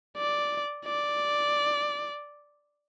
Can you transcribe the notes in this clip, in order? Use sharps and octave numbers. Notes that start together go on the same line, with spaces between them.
D5
D5